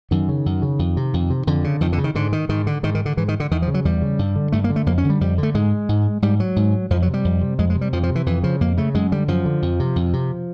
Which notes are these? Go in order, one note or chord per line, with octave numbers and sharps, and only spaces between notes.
F#2 D#3
C#3
F#2
C#3
F2
C3
F2
C3
F2 D3
C#3
F2 D#3
D3
C#3
D#3
G#2 D3
D#3
G#2 D#3
D3
G#2 D#3
D#3
D3
G#2 E3
D#3
D3
E2 D#3
F3
C#3
F#3
E2 G3
C#3
G2
D3
G2 A3
A#3
D3
A3
F2 A#3
C#4
D3
G3
F2 G3
D3
A3
G#2 G#3
G#2
G#2 G3
F#3
G#2
F2 F3
F#3
C3
G3
F2
C3
F2 G#3
G#3
C3
G3
F2 F3
F3
C3
E3
F2 E3
C#3 F3
F2 A#3
C#3 A3
F#2 G#3
D3 G3
F#2 F3
D3
F2
C3
F2
C3